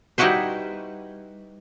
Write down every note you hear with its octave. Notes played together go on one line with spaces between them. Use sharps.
G3 D#4 E4 F#4 B4 C5